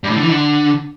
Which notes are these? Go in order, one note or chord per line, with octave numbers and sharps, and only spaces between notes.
G2
A2
D3
E3
D3